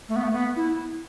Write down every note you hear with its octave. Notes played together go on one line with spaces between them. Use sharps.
A3
B3
A3
B3
E4